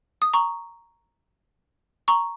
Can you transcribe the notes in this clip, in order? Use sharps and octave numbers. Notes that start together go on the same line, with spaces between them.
D#6
A#5 C#6
A#5 C#6